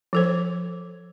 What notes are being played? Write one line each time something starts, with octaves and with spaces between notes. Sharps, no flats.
F3 A4 C5